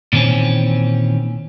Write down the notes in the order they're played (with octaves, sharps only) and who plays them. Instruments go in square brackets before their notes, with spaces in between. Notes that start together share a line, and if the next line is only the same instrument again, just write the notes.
[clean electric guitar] A#2 D#3 E3 C4 C#4